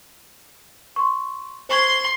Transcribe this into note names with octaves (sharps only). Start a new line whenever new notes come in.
C6 C#6
C5 C6 C#6 G#6